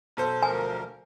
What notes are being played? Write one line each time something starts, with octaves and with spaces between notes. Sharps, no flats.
B1 A4 C5
D2 F3 A#4 G#5